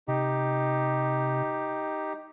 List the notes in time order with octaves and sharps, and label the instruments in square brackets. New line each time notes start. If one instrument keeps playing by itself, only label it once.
[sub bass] C3 [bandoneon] D#4 G4